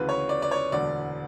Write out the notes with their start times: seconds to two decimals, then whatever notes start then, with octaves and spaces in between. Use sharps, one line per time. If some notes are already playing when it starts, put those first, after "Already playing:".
Already playing: D2 C#3 E3 B4
0.09 C#5
0.29 D5
0.42 D5
0.51 C#5
0.72 E1 D2 D3 D5